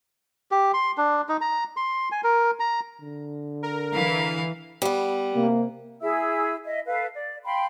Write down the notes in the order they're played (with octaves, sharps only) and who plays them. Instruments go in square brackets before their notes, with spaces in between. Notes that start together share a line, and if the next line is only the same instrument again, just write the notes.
[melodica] G4
C6
D4
D#4
A#5
C6
G#5
A#4
A#5
[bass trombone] D3
[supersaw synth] A#4
[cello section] E3 [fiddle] F5
[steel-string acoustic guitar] G3 B3
[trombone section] C3 A#3
[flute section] E4 G#4 E5 E6
D#5 E5
A4 B4 F5
D5
F5 G5 B5 C6